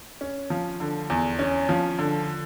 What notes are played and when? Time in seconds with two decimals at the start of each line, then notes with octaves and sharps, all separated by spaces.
0.21 C#4
0.50 F3
0.80 D3
1.10 E2
1.39 C#4
1.69 F3
1.99 D3